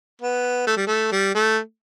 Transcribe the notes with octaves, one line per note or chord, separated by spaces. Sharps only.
B3
A3
G3
A3
G3
A3